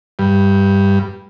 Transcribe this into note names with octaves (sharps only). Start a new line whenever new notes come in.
G2